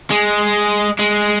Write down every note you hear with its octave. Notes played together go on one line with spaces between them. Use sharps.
G#3
G#3